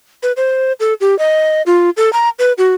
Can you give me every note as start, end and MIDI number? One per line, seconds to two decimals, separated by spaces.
0.23 0.32 71
0.37 0.73 72
0.80 0.94 69
1.01 1.17 67
1.19 1.62 75
1.66 1.90 65
1.97 2.12 69
2.13 2.29 82
2.39 2.53 71
2.58 2.75 66